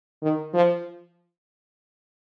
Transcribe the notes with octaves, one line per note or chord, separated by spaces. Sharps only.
D#3
F3